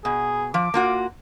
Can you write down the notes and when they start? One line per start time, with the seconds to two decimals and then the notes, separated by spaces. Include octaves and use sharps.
0.05 B2 G#4
0.54 F3 D6
0.74 A#3 F4 F#4